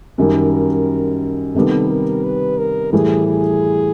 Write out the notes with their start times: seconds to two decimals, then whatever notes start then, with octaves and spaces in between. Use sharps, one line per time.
0.18 F#2 D#3 G3 A#4
0.53 A#4
1.55 C3 D#3 G3 B3 A4
1.90 A#4
2.24 B4
2.58 A#4
2.93 A2 E3 G3 G#4
3.27 G#4